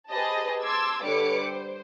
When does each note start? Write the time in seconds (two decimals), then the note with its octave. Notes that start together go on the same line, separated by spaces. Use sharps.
0.10 G4 G#4 B4 C5 D#5 A5
0.63 A5 C6 D6 E6 G#6
1.03 D3 G3 B4 C#5 D6 C#7
1.42 C5